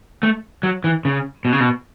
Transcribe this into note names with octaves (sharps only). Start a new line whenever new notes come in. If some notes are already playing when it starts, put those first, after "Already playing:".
A3
F#3
E3
C#3
B2
C#3
B2